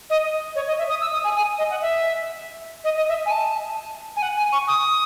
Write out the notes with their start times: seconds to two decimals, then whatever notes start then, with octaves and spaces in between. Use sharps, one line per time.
0.10 D#5
0.56 C#5
0.67 D#5
0.78 E5
0.90 D#6
1.01 E6
1.13 D#6
1.24 G#5
1.36 G#5
1.58 D#5
1.70 F#5
1.82 E5
2.84 D#5
2.96 D#5
3.08 E5
3.26 G#5
3.31 A5
4.16 G#5
4.22 F#5
4.37 G#5
4.53 C#6
4.68 D#6